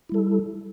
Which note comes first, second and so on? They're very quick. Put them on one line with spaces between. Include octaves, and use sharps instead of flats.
E4 G3 A4